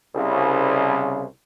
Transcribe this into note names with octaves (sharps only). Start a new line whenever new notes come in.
C2 C#3